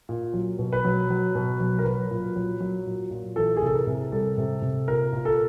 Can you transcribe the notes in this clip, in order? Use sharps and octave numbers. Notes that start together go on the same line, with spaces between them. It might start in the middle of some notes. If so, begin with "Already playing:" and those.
A#2
F#3
B2
B4
F#3
F#3
B2
F#3
A#4
F#3 B4
A#2
F#3
F#3
A#2
A#2
E3 A4
G#4
C3 A4
A#4
C3
G3 A4
C3
C3
A#2 A#4
A#2
A4